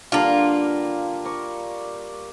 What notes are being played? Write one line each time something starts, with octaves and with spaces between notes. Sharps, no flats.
D3 G3 A#3 D4 F4
A#4 D5 C#6